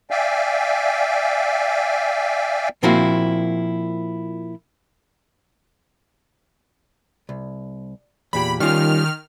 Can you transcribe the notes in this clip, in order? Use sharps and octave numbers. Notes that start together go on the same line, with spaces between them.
D5 E5 F5 G5 G#5
A#2 F3 A#3 C4 E4 F#4
C2
E2 A#2 G4 B5
D#3 G3 C#4 F4 F6